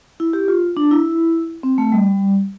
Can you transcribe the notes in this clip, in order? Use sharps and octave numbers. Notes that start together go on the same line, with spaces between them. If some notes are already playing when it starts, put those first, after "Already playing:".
E4
G4
F4
D4
E4
C4
A3
G3